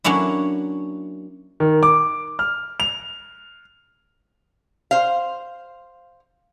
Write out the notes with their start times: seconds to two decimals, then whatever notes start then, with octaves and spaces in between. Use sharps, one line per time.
0.04 F#3 A#3 C#4 D4 E4
1.60 D#3
1.83 D6
2.39 F6
2.80 F7
4.91 C5 F5